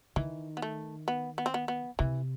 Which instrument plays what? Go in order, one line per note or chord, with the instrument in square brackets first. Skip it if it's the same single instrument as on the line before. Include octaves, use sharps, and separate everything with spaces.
[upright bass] D#3 [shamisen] E3
[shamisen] B3
A3
B3
B3
C4
B3
B3
[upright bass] C3 [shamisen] E3